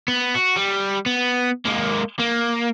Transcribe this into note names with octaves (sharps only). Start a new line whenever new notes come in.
B3
F#4
G3
B3
G#3 A#3
A#3